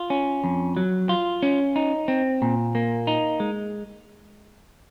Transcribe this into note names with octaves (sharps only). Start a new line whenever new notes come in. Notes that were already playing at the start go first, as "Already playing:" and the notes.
Already playing: F4
C#4
F2
F#3
F4
C#4
D#4
C4
A#2
A#3
D#4
G#3